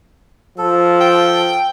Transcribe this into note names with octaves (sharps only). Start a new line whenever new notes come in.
F3 A4
G5